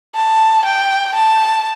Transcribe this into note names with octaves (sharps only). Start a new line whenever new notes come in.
A5
G5
A5